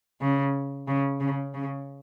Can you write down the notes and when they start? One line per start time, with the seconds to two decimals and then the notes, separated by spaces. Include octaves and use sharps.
0.21 C#3
0.88 C#3
1.20 C#3
1.54 C#3